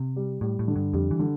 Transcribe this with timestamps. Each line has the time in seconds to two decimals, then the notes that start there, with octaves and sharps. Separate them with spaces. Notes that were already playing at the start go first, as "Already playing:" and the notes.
Already playing: C3
0.16 G3
0.41 A2 G3
0.59 A2
0.68 D3
0.76 G2
0.93 F2 G3
1.11 E3
1.19 D3